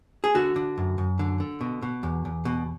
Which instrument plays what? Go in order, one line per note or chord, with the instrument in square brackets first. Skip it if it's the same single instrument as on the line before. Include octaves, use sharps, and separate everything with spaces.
[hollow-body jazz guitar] G#4
D3 F#4
D3
F#2
F#2
D3
D3
B2
B2
E2
E2
B2